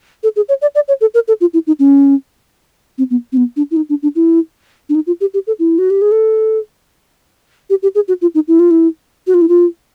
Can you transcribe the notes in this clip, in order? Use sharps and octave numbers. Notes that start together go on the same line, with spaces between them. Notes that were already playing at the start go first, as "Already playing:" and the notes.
A4
G#4
C#5
D5
D5
C#5
A4
A#4
A4
F4
E4
D#4
C#4
C4
B3
C4
B3
D4
E4
D#4
D4
D4
E4
D4
D#4
F4
G4
G4
A4
E4
F#4
G4
G#4
A4
G4
G4
G#4
F#4
F4
D#4
E4
F4
E4
F#4
F4
E4
F4